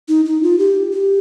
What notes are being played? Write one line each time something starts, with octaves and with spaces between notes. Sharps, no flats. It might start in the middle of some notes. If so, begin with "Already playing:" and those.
D#4
D#4
F4
G4
G4